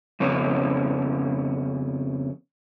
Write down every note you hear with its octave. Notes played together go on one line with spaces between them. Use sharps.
F2 C#3 B3 C#4